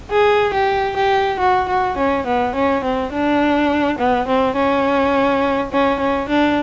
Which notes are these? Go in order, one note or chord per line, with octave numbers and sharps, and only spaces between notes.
G#4
G4
G4
F#4
F#4
C#4
B3
C#4
C4
D4
B3
C4
C#4
C#4
C#4
D4